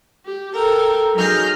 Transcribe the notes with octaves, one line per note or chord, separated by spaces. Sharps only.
G4
A4 A#4 G5
F#3 D#4 G#4 F6 G6 A#6